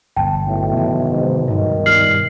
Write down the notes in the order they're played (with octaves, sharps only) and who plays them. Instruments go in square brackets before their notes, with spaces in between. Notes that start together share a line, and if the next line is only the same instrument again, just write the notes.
[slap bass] G1 B2 [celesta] G5 A5
[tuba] B1 [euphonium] A2
[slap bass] C3 D#3 E3
[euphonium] G#2
[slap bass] G2 B2 [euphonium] D#3
[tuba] G3 [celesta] F6 C7 F#7